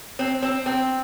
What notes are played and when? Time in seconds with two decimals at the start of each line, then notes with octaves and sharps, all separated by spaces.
0.19 C4
0.43 C4
0.66 C4